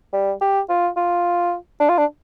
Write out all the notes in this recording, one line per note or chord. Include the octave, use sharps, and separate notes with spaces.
G3
G4
F4
F4
D4
F4
D4